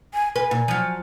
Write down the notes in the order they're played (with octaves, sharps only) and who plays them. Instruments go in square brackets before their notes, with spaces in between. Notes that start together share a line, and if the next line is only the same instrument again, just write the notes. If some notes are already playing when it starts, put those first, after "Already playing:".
[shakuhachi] G#5
[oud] B4 [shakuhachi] G#5
[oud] A#2
F3 F#3